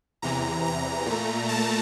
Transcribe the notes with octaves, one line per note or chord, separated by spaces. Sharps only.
E2 C3 E3 A#5
A#5
A#2 A3
A5